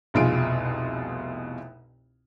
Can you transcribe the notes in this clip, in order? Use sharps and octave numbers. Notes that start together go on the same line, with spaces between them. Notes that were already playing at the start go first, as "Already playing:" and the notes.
F1 C2 B2 F4 G#4 D7